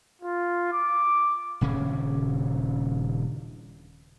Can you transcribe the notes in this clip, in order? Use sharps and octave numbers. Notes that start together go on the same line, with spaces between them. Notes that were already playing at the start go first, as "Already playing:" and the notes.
F4
D6
D#1 C#3 C#4